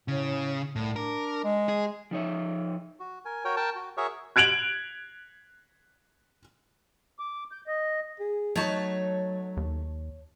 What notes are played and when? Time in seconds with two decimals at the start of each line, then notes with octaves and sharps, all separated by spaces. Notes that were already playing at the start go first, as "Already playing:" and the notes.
0.08 A2 C#3
0.76 C2 A2
0.96 D4 A#4
1.44 G#3
1.69 G#4
2.11 F3 D#4 C#5 E5
3.00 F#4
3.25 A#4 G#5
3.45 F#4 A#4 C#5 G5
3.57 A#4 G5 A5
3.76 F#4
3.97 F#4 G#4 A#4 C#5 E5 C#6
4.36 F#6 G#6 D7 F7 F#7
7.19 D6
7.52 G6
7.67 D#5
8.20 G#4
8.55 F#3 A3 D#4 F#4 C#5 A5
9.57 D#2